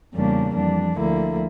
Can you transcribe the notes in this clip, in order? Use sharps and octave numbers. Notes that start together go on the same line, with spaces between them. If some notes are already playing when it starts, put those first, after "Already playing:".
E2 C#3 G3 A#3 D4
F2 E3 G3 D4
D2 D3 F3 A#3 E4